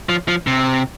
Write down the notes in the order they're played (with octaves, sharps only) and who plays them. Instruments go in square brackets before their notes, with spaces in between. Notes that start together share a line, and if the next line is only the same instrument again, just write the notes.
[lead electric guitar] F3
F3
C3